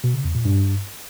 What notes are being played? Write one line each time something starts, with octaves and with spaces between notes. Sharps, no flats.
B2
C#3
E2
A#2
G2